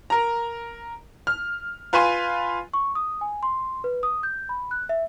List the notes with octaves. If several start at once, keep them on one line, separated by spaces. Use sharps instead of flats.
A#4 A#5
F6
F4 B4 G#5 C6 D#7
C#6
D#6
G#5
C6
B4
D#6
G6
B5
F#6
E5